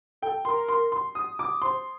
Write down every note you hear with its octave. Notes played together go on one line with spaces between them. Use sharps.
A4 G5
A#4 C6
C6
C6
D#6
D6
C5 C6